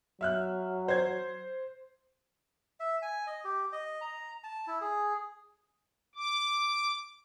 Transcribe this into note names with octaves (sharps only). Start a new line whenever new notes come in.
F#3 E5 F6 F#6
C5 G#6
E5
G#5
D#5
G4
D#5
A#5
A5
E4
G#4
D6